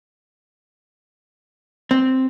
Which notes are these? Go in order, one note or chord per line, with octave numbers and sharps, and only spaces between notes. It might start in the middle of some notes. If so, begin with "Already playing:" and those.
C4